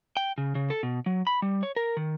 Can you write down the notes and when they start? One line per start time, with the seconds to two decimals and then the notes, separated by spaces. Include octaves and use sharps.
0.17 G5
0.38 C#3
0.55 C#3
0.70 A4
0.83 B2
1.06 F#3
1.27 B5
1.42 G3
1.63 C#5
1.76 A#4
1.97 D#3